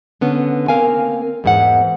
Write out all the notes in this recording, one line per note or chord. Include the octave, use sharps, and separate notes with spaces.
D3 B3 C#4
A#3 C4 A#4 F5 G#5
E2 G#2 F#5